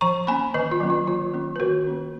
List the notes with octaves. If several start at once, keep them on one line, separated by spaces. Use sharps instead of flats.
F3 A#5 C#6
A#3 C#4 G#5 B5
D#3 B4 D#5
F4
F#3 A#3 C#4
F4
D#3 F4
A#3 C#4
B4
D#3 F#4 A#4
A#3 C#4